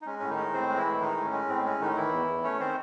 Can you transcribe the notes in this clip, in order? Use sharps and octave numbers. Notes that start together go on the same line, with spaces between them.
D#4
G#3 C#4
A2 C#4
D#3 D#4
G#3
A2 C4 C5
G#3
E3 E4
A2
D#3 G#3 D#4
A2
C#4
G#3
A2 C4
G#3 C#4
A2 D#3 D#4
D#3 E3 E4
E2
E2
A3 C#4 C#5
D#3 C4 C5